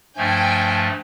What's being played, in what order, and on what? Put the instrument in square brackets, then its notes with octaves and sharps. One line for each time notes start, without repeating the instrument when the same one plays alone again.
[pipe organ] G2 F3 A3 [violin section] G5 G#5